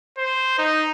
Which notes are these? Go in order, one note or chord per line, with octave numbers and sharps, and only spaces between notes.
C5
D#4